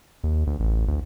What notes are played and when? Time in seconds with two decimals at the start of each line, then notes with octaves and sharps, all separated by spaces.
0.24 D#2
0.47 D2
0.60 A1
0.88 D2